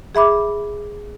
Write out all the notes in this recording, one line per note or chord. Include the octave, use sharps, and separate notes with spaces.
G#4 E5 B5 D6